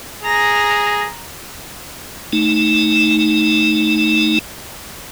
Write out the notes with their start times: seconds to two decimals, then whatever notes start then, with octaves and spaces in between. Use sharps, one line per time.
0.22 G#4 A#5 A#6
2.33 A3 D#4